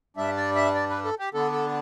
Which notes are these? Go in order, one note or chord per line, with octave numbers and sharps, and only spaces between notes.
G2 G3 D4 E5
D5
E5
D5
B4
A4
G4
D3 B3 D4 A4
A4